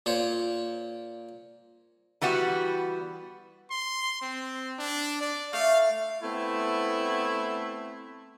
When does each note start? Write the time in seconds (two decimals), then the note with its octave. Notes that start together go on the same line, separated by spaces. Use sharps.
0.06 A#2 C5 C#5
2.21 E3 G3 B3 F#4
3.71 C6
4.22 C4
4.79 D4
5.21 D5
5.53 A3 F5
6.22 A3 B3 C4 E4